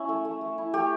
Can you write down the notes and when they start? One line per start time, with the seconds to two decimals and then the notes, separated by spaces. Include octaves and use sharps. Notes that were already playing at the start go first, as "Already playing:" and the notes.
Already playing: C#4 E4 E5
0.09 A3
0.25 A3
0.41 A3
0.58 E4
0.74 A3 G4